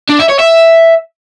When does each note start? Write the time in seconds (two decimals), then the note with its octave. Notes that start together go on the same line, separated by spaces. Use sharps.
0.10 D4
0.20 E5
0.30 C#5
0.40 E5